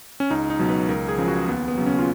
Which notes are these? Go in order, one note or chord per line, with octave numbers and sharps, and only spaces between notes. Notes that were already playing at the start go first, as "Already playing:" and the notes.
C#4
C#2 D#4
D#4
B2 F#3
B4
C#2 A#4
G#4
C#3 F3
F#4
D#2 B3
B3
C#3 F#3
C#4
F4